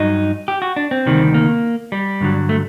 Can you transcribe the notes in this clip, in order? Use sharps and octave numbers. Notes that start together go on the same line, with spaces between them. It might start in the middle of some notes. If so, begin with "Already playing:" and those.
Already playing: G2 F#3 D#4
G4
F#4
D4
C4
D2 C3 D#3 G3
A#3
G3
G2 D3 F#3
A3